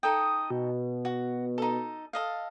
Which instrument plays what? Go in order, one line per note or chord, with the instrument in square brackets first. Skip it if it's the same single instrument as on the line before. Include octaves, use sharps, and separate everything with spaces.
[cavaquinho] D#4 A4 G5 [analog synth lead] D#6
[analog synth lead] B2
[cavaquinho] F#4
D#4 A4
A4 D#5 F5